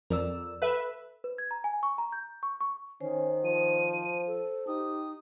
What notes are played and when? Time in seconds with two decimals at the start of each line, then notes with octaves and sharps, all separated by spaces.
0.10 F2 A#4 D5 E6
0.62 A4 B4 E5
1.24 B4
1.38 G#6
1.51 A#5
1.64 G#5
1.83 C#6
1.98 A#5
2.12 G6
2.43 C#6
2.61 C#6
3.01 D#3 C#4 C5
3.45 F3 D#7
4.27 A4
4.67 D#4 G4 D#6